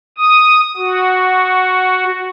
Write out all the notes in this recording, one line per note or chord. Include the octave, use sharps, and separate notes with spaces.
D#6
F#4